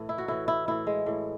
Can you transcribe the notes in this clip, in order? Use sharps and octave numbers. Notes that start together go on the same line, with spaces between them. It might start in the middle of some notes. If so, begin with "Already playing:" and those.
Already playing: A2 E3
E4
F#4
A2 E3 E4
E4
A2 E3 E4
G#3
A2 E3